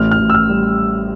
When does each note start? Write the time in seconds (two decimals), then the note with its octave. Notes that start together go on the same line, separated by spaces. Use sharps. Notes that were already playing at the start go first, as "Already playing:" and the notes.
Already playing: A1 F6
0.11 F6
0.19 A1
0.30 E6
0.35 F6
0.49 G3